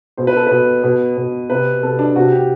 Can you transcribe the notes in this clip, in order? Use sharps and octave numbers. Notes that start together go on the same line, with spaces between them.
B2 C5
B4
A4
B2 B4
B2
B2
C3 B4
C3 A4
D4
C3 F#4
G4